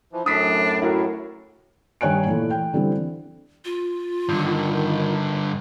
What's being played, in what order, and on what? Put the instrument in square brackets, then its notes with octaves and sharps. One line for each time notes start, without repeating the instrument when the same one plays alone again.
[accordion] E3 F3
[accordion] F#2 A2 [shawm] D4 [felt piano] D#6 B6
[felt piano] E4 F#4 A#4
G2 D#3 C#5 G#5 F#6 D7
A#2 E3 A3
G5
D3 E3 G3 C4
[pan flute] F4
[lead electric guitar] G2 D3 [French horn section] D#3